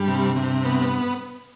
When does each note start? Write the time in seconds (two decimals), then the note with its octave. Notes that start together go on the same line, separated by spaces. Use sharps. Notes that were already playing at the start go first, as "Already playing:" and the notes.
Already playing: G2 G3
0.08 C3
0.36 C3
0.65 B3